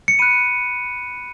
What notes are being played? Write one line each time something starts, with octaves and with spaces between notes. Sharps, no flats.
C#7
B5 F#6 D#7